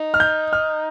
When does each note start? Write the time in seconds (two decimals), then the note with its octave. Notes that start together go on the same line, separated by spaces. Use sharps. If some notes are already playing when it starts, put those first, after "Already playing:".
Already playing: D#4
0.14 F6
0.20 G6
0.53 F6